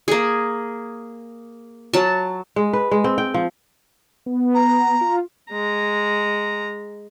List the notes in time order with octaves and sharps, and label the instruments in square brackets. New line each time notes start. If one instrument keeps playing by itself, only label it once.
[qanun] A#3 G#4
F#3 A5
[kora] G#3
B4
G#3
C4
G5
F3
[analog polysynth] B3
[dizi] A#5
[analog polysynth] F4
[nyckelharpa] G#3 A#5